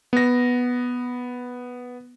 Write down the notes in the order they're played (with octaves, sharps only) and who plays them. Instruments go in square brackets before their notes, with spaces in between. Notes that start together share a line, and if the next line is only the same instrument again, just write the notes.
[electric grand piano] B3 A#6